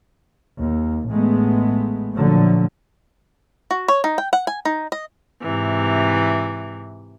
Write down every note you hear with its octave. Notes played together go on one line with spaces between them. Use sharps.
D#2
A1 G#3 A3 B3
A#2 D3 F3 F#3 A3
F#4
C#5
D#4
G5
F#5
G#5
D#4
D#5
G#2 C3 E3